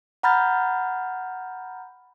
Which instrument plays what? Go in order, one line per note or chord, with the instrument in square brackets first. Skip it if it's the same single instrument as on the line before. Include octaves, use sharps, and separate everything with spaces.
[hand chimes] F#5 A#5 B5 F6 G6 A6